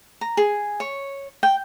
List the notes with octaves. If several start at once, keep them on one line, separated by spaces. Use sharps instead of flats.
A#5
G#4
C#5
G5